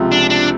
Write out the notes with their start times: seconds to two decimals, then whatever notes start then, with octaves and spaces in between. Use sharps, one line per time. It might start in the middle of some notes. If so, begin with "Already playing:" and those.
Already playing: C#2 C3 F3
0.12 D4
0.30 D4